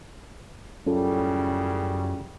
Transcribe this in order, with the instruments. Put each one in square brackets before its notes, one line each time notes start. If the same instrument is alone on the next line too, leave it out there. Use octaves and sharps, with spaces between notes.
[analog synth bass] F#2 [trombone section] A2 C#3 G3 [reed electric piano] C#4 F4 A4